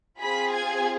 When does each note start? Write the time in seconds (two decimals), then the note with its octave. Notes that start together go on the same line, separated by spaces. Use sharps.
0.21 C4 F4 G#4 B5 B6
0.54 G#5 G#6